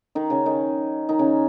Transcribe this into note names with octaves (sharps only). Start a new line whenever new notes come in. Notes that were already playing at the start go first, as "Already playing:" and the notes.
D#3 D#4
C#3 C#4
D#3 D#4
D#3 D#4
C#3 C#4